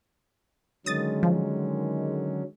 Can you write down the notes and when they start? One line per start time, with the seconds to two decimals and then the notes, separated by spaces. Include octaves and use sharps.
0.86 D3 D#3 F#3 G#3 C#4 D#6 A6
1.23 F3